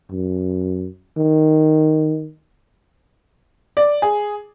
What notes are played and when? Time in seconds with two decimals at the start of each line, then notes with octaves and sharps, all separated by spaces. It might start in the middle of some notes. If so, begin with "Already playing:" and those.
0.11 F#2
1.17 D#3
3.77 D5
4.02 G#4